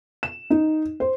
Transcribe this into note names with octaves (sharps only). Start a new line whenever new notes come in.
E7
D#4
C5